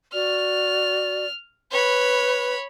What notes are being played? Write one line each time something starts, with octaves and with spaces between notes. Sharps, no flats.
F#4 D5 F6
B4 C#5 B5